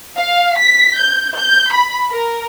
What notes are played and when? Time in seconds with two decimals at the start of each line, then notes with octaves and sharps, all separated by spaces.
0.16 F5
0.57 B6
0.98 G6
1.36 G6
1.72 B5
2.11 A#4